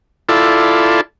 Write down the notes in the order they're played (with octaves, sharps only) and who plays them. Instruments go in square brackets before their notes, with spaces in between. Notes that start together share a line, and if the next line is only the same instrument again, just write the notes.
[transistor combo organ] E4 F4 A4 D5